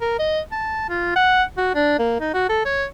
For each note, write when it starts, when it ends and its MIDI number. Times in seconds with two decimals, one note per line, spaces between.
0.01 0.15 70
0.19 0.40 75
0.52 0.87 81
0.89 1.12 65
1.16 1.43 78
1.57 1.73 66
1.75 1.96 62
1.99 2.16 58
2.20 2.33 63
2.34 2.45 66
2.49 2.62 69
2.65 2.85 73